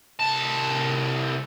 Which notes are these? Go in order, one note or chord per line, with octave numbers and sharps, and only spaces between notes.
C2 A5